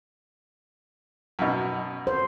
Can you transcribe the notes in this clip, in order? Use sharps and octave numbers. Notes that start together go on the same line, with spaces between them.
F#2 B2
C5